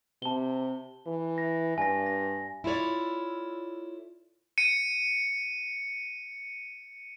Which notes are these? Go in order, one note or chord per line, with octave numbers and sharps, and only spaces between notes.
C3 A5 G7
E3
A#6
G2 G#5 A#6
A#6
E4 F4 A4 C#5 D5
C#7 D#7